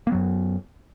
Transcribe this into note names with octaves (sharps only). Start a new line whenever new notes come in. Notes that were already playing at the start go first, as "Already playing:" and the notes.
F#2 F#3 A#3 B3